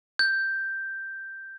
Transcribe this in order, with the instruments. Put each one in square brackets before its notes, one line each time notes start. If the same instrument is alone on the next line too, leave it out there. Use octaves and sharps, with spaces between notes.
[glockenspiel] G6